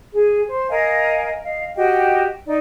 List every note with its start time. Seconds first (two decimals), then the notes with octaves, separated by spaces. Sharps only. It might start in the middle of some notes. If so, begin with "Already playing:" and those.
0.13 G#4
0.47 C5
0.69 A#4 D#5 F5 G#5
1.43 D#5 F5
1.76 F#4 G4 D#5 G5
2.46 D#4 D5